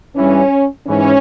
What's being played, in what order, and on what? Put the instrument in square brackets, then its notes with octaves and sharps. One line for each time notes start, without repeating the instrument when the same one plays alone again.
[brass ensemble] G2 E3 C#4
G#2 E3 C#4